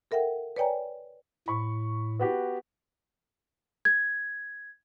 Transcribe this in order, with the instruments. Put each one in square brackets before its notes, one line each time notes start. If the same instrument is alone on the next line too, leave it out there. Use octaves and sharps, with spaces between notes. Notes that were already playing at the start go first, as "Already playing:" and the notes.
[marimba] A4 A#4 E5 F#5 G5
B4 C#5 D5 G5 G#5 A#5
[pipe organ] A2 [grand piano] B5 C#6
[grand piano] B3 F#4 G4
[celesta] G#6